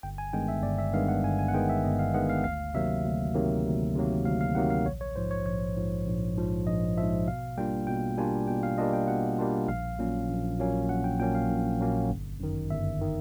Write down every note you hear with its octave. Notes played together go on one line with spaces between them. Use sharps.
G1 G5
G#5
G2 D#3 G#3 B3 G5
E5
G1 D5
E5
G2 D#3 G#3 B3 F5
F#5
G1 G#5
G#5
F#5
G2 D#3 G#3 B3 G5
E5
G1 D#5
F5
G2 D#3 G#3 B3 F#5
F5
D2 F5
C3 D#3 F#3 A#3 E5
D2
C3 D#3 F#3 A#3
D2
C3 D#3 F#3 A#3
D2 F5
F5
C3 D#3 F#3 A#3 F#5
F5
A#1 C#5
C#5
G#2 F3 C5
C#5
A#1 C#5
G#2 F3
A#1
G#2 F3
A#1 D#5
G#2 F3 E5
B2 F5
G3 A#3 D4 F4 G5
B2 G5
G3 A#3 D4 F4 G#5
B2 G5
F5
G3 A#3 D4 F4 D#5
G5
B2 F#5
G3 A#3 D4 F4
A#1 F5
A#2 F#3 A#3 C#4
A#1
A#2 F#3 A#3 C#4
A#1 F#5
G5
A#2 F#3 A#3 C#4 G5
F5
A#1
A#2 F#3 A#3 C#4
G1
F#2 D#3
G1 E5
D#3